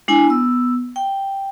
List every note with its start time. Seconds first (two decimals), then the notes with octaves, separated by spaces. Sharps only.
0.08 G#3 D4 E4 G#5
0.27 B3 E6
0.96 G5